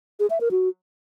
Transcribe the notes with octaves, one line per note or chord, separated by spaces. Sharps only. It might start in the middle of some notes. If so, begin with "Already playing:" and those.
G#4
E5
A#4
F#4